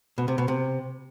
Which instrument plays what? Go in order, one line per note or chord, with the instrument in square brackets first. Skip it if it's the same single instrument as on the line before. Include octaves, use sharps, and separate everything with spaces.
[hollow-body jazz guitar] B2
C3
B2
C3